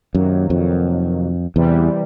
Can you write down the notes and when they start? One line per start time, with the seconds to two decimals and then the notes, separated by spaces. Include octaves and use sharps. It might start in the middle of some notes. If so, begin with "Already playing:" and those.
0.15 F#2 C3 D#3 F#3 A#3
0.50 F2
1.56 E2 C3 E3 G3